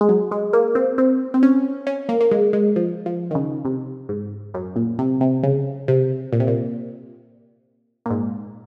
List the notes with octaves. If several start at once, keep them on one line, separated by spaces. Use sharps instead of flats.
G#3
F#3
G#3
A#3
C4
C4
C4
C#4
C#4
A#3
A#3
G#3
G#3
F3
F3
D#3
C#3
C3
G#2
F#2
A#2
C3
C3
C#3
C3
A#2
C3
A#2
A#2
G#2